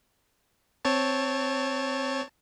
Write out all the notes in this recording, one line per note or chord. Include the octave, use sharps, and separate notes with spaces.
C4 C#5 A5